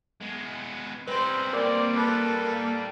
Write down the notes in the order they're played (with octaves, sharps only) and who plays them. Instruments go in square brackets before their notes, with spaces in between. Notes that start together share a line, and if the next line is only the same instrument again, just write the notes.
[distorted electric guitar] G#3 B3
[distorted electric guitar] G3 D#4 [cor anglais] C4 [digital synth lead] B4 [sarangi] C5
[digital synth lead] A#3 [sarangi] C4 [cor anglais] D5
[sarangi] A4 [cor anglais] B4